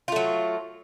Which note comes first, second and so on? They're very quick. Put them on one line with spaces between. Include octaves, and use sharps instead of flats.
F4 A3 F#3